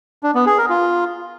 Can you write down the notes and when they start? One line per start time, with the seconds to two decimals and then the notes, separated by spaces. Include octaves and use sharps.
0.23 D4
0.35 B3
0.46 G#4
0.58 A#4
0.69 F4